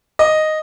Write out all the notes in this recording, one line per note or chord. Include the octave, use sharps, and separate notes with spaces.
D#5